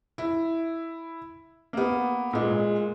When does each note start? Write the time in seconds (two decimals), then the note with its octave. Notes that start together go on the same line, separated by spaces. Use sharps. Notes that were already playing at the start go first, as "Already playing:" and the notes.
0.18 E4
1.73 A#3 B3
2.33 A#2 G#3